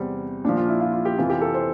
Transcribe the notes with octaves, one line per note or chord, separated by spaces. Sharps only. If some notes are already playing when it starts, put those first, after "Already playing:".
Already playing: E2 C3 G3 C4
A#2 F3 D4
F4
E4
F4
F4
G4
F2 C3 E3 F4
G4
A4
C5